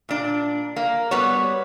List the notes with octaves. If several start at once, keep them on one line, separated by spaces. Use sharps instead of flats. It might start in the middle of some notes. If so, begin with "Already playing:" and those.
A#2 D4
A#3
G3 B3 F#4 C#5